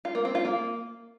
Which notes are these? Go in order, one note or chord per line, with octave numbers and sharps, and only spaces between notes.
F4
A#3
C4
F4
A#3